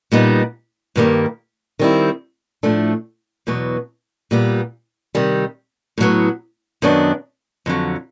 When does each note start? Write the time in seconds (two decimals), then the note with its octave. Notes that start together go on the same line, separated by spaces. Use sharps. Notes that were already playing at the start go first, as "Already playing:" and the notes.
0.12 A#2 G3 B3 D#4
0.96 G2 D#3 G3 A#3
1.79 D#3 G3 C4 E4
2.63 A2 F3 A3 D4
3.47 E2 B2 F#3 B3
4.31 A#2 G3 B3
5.15 C3 D#3 G3
5.98 A2 F#3 B3
6.82 F#2 D#3 F#3 B3 D4
7.66 F2 D3 F#3